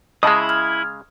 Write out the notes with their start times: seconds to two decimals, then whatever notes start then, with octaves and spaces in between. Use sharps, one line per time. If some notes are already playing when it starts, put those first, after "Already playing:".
0.23 C#3 G#3 E4 D#5 A5 D#6 E6
0.49 F6 G#6